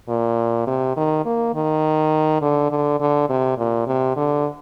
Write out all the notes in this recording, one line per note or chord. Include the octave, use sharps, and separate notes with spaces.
A#2
C3
D#3
A#3
D#3
D3
D3
D3
C3
A#2
C3
D3